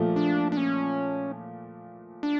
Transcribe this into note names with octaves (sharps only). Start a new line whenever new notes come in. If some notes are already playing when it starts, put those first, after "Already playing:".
Already playing: A#2 F3 A3
D4
D4
C#4
D4